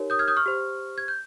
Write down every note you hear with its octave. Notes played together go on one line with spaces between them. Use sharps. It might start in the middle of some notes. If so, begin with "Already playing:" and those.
Already playing: D#4 G4 A#4 C#5
D#6 G6
F6 G#6
D#6 G6
C#6 F6
G4 C5
G#6
G6